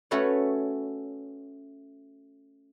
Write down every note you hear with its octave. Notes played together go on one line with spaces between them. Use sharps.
A3 C#4 F#4 A4 B4 C#5